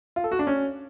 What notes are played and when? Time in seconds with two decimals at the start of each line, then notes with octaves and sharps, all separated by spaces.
0.16 F4
0.24 A4
0.32 F#4
0.39 D4
0.47 C#4